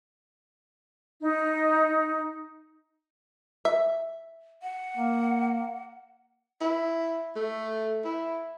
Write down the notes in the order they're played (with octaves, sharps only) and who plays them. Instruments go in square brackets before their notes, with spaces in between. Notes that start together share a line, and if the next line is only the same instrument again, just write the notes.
[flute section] D#4
[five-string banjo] E5
[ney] F#5
[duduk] A#3
[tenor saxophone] E4
A3
E4